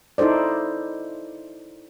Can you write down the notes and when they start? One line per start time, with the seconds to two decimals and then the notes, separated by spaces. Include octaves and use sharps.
0.18 D#4 E4 A4 C5 D5